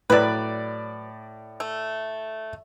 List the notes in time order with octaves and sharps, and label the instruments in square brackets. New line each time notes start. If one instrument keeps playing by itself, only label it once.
[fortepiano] A2 D5 [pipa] F#3 B4
[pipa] A3